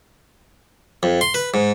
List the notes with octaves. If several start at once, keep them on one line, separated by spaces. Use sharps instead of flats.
F2
C6
B4
G#2